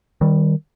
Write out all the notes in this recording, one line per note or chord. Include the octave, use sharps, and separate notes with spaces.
D#3 G3